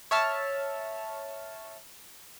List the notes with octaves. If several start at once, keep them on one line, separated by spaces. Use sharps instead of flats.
C#5 E5 A5 F6